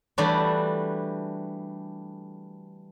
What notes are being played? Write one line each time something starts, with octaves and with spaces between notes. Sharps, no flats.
E3 G3 A3 D4 F#4